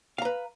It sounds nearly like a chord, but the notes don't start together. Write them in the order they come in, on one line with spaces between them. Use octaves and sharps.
F5 A#5 B4